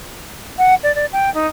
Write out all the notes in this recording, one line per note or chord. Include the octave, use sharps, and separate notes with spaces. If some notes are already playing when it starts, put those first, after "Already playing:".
F#5
D5
D5
G5
D#4